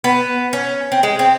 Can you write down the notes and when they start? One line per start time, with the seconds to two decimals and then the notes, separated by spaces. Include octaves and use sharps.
0.04 B3
0.53 C#4
0.92 C4
1.03 G#3
1.19 C4